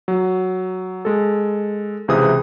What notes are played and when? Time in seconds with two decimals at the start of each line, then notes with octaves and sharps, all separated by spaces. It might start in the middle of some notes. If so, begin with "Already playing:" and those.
0.08 F#3
1.05 G#3 A4
2.08 C#2 C3 E3 G#4 D#6